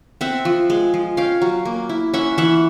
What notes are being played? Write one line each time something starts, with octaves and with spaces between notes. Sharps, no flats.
C4 E5 F#5
F3
G#3
F3
C#4 F5 G5
F#3
A#3
E4
C#4 E5 F#5
E3 E5 F#5